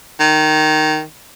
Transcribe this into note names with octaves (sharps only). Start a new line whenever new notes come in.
D#3